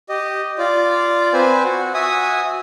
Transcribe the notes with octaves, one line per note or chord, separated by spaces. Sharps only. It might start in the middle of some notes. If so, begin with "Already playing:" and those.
G4 D#5
F4 D5
C4 B4 C5 G#5
F#4
F#4 E5 G#5 D#6